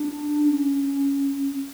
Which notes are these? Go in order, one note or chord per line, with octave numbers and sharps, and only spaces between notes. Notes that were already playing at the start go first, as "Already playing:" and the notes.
Already playing: D4
D4
C#4